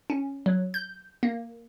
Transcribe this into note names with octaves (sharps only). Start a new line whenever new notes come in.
C#4
F#3
G6
A#3